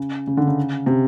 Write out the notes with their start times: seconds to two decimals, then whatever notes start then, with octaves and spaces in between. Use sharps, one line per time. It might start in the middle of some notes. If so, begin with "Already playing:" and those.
Already playing: C#3
0.27 C#3
0.37 D3
0.47 C#3
0.86 C3